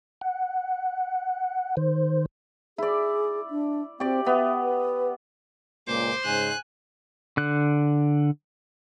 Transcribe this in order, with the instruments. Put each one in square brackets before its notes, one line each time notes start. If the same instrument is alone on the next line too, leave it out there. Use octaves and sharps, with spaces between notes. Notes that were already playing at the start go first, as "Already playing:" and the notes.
[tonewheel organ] F#5
D#3 C5
[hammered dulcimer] E4 D5 [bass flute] G#4
[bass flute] D4
[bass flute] C4 [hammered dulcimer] G4 D5
[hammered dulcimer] B3 [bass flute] E5
[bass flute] B4
[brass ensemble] C#2 A#2 [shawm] C5 [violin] D6
[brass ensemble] G#2 C#3 [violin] G#5 F#6
[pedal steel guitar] D3 F#6